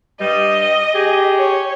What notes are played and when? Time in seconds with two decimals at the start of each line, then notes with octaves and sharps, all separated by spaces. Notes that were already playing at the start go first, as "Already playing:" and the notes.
0.20 G2 G3 D#5
0.95 G4 G#4
1.36 C#5